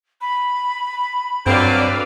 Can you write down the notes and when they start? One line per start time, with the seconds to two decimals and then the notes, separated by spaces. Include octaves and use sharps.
0.21 B5
1.46 G2 D3 F#3 C4 B4 D5 F5